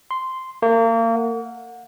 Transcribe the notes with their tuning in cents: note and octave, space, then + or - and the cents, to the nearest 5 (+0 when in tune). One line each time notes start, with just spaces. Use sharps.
C6 -10
A#3 -35
F#5 -30